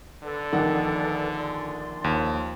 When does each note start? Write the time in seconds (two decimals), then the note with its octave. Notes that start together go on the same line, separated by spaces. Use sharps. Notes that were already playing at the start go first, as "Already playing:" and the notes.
0.23 D3 A4 B4 D5
0.53 A#1 D#3 F#5
1.38 D5 C6
2.04 D#2 F3